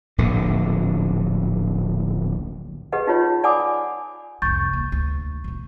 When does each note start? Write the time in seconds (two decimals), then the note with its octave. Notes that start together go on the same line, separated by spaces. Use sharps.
0.18 D1 A#1 A#2 D3
2.92 G4 G#4 B4 D#5 F#5
3.07 D#4 F4 G4 C#5
3.44 D5 F#5 G#5 B5 D6 D#6
4.42 C2 F2 C#6 G6 A6
4.73 D#2
4.92 D2
5.44 E2 B2